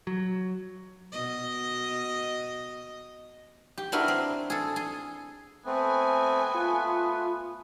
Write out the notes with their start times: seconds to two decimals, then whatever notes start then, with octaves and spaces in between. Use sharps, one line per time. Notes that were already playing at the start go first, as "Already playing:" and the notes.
0.07 F#3
1.12 B2 D#5
3.78 G4
3.92 B3 D4 E4 F#4 A#4 B4
4.08 C4
4.50 G#4 A4
4.76 G#4
5.66 A3 B3 C4 G#5
6.54 A3 F4